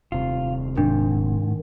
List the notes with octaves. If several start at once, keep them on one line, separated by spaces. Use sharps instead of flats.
D#1 C3 F4
G#2 D#3 D4